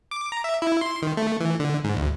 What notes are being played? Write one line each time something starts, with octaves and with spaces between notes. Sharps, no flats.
D6
A#5
E5
E4
C6
D#3
A3
E3
D3
G#2
D2